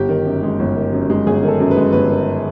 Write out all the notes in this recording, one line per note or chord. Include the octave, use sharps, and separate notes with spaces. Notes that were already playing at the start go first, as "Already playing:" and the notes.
Already playing: G1 G4
D#3
F#2
G#3
G1
D#3
F#2
G#3
G1 G#4
D#3
A4
F#2
B4
G#3
G1 B4
D#3